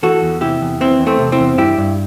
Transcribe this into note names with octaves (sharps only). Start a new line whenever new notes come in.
E3 F#4 A4
E2
C3 E4 G4
E2
E3 C4 E4
E2
A3 C4
C3
C4 E4
E2
G2 E4 G4
G2